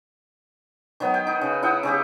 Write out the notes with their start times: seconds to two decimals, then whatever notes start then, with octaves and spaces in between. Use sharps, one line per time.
1.00 D#3 F#3 B3
1.14 G5
1.27 D#4
1.41 C#3
1.62 D#4 E4 F#5 G5
1.83 C#3 C#4 G4